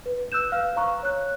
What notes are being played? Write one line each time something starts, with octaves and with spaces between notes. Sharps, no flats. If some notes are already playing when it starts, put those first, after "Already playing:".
B4
E6 F#6 G6 E7
B4 F5 F6
C5 F5 A#5 C#6 F#6
C#5 F#6